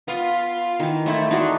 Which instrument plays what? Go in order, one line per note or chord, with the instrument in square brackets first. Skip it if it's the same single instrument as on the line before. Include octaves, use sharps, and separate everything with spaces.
[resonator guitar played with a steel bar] B3 [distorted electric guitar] F4
[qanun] D#3 E3
[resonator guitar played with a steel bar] F2 E4 C5 [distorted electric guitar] A3
[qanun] D#4 F#4 [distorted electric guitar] A4 D5